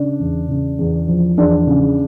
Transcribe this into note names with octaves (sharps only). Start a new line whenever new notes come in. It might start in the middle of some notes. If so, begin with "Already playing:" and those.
Already playing: C#3 D4
E2
C#3
E2
F3
E2 D4
C#3